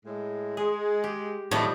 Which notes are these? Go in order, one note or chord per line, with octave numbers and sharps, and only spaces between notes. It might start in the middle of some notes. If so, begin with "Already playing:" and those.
A2 G#3
G#3 G#4
G4
A2 D3 F3 G3 A3 C4 D#4